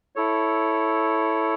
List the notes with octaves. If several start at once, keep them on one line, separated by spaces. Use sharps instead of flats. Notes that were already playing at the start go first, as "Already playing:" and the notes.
E4 A4 C#5